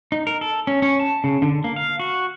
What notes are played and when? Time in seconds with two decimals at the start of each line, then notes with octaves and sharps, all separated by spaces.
0.12 D#4
0.27 A#4
0.41 A4
0.67 C#4
0.82 C#4
1.00 A5
1.24 C#3
1.42 D3
1.64 A#3
1.76 F5
2.00 F#4